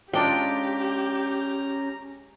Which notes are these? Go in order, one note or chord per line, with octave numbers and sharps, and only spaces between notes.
G#3 C#4 D4 F4 G4 G5 A#5